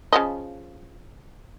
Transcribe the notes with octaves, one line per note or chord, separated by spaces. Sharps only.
C#3 F3 D#5